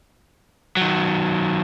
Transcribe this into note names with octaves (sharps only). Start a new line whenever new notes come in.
D#3 F#3